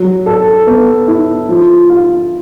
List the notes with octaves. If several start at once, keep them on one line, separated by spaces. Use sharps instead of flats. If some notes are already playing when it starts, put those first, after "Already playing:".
Already playing: F#3
A4
B3
E4
F3
F4